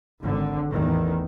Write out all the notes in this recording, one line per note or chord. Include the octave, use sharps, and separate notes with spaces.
G#1 D3
A1 E2 D#3